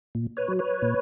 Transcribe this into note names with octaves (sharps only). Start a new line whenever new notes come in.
A#2
B4 C#5
F#3
B4 C#5
A#2